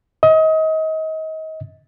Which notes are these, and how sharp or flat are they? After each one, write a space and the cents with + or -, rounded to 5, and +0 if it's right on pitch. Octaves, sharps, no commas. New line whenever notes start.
D#5 +30